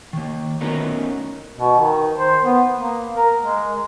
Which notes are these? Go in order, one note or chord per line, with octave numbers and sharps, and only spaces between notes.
D#3 A#3
A3 B3 C#4 D#4 F#4 A#4
B2
D#3
C5
B3
A#3
A#4
G#3